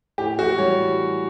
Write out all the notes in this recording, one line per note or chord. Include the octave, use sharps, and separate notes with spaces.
A2 G4
E3 F#4
G3 C#5